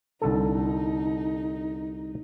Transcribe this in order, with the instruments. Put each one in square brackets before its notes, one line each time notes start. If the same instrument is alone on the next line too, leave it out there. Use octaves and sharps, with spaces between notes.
[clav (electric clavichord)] C2 D3 A4 [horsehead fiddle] D#4